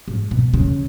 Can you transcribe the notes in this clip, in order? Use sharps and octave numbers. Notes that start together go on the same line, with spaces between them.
G#2
B2
C#3